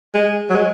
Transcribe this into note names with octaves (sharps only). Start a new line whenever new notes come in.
G#3
F#3
G#3